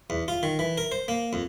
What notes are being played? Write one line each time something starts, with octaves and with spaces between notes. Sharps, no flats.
E2
F4
D#3
E3
A#4
C5
A#3
F2